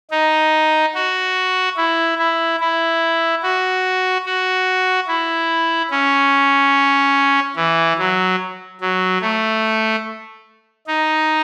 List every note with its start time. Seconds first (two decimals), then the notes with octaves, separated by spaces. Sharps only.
0.11 D#4
0.95 F#4
1.77 E4
2.19 E4
2.60 E4
3.43 F#4
4.26 F#4
5.08 E4
5.91 C#4
7.56 E3
7.98 F#3
8.81 F#3
9.22 A3
10.87 D#4